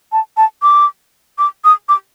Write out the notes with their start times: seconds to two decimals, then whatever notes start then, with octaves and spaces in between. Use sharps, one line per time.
0.12 A5
0.37 A5
0.62 D6
1.38 D6
1.64 D#6
1.89 D6